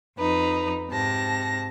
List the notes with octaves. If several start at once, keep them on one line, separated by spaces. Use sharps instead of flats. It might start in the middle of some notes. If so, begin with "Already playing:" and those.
F2 D#4 B4
G#2 C3 A5 A#6